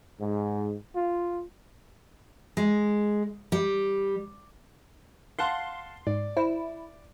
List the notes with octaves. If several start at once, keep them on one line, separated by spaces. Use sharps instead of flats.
G#2
F4
G#3
G3
F5 F#5 A5 C6
G#2 D5
E4 C5